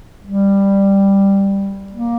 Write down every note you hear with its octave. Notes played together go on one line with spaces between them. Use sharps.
G3
A#3